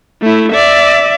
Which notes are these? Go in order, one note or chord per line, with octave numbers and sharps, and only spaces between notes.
A3 E4
D5 E5